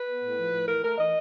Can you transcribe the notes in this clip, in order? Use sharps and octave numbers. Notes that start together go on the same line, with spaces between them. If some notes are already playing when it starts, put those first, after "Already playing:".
Already playing: B4
B3
A2
F3
A2
E3 A#4
A3 A#4
E3 D#5